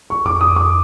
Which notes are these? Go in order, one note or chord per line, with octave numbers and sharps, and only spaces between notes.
C#6
F2 D6
D#6
D6